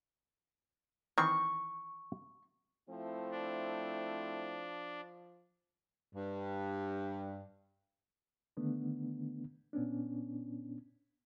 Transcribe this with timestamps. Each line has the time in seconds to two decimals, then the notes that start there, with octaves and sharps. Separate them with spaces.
1.18 D#3 E3 C4 C#6
2.89 F3 A3 C4 E4
3.32 D4
6.14 G2
8.57 D3 D#3 A3 B3 D4
9.73 A#2 B3 C#4 D4